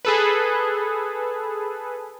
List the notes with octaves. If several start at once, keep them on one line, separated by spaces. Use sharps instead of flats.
G#4 A4 B4